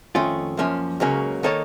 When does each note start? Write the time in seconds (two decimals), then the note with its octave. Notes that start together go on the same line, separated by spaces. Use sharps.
0.15 F2 D#3 A3 C#4 F4
0.57 F#2 F3 A#3 C#4
1.00 C#2 C#3 F#3 A#3 C#4
1.43 D#3 A#3 D#4 A4 C#5